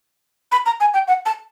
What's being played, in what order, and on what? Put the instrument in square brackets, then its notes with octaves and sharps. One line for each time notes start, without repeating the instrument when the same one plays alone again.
[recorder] B5
A#5
G#5
G5
F#5
A5